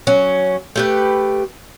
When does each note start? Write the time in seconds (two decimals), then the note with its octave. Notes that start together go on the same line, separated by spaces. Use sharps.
0.07 F#3 C#4
0.76 A3 G4 B4